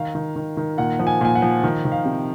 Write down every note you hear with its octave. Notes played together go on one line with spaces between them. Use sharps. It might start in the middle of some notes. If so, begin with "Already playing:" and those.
Already playing: D#3 F5
D#3
D#3
D#3
A#2 F#5
F3
G#5
A#2 G#5
F#5
F3
D#3
D#3
F5
C3